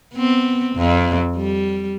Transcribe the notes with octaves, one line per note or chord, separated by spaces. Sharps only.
B3 C4
F2
G3